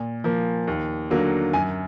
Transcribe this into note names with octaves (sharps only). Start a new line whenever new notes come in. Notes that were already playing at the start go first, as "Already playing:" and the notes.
Already playing: A#2
F3 A#3
D#2
D3 F#3 A#3
F#2 G#5